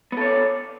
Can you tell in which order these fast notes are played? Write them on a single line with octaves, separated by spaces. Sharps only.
B3 A4 C#5 D5